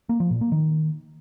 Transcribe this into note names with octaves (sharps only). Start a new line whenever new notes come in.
A#3
F3
A#2
A#3
D#3